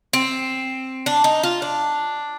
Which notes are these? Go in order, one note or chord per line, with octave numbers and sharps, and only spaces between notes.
C4
D4
D#4
F4
D4